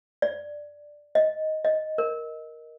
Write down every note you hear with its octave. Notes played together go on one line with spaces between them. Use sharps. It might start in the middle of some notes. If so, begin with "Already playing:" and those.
D5
D#5
D#5
A#4